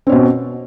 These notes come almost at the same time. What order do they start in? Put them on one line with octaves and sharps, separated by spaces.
C4 C#4 B2